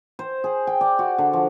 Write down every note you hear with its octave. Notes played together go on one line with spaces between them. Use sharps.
C5
G#4
G5
D5
F#4
D3
F3